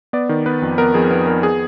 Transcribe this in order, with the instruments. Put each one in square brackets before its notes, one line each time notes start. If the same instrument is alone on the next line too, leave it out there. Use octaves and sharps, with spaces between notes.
[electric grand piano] B3 D5
D#3
B3 B4
F2
B3 A#4
F2 G#4
B3
B3 A#4
G#4